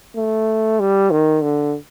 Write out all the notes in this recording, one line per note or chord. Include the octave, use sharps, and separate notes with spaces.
A3
G3
D#3
D3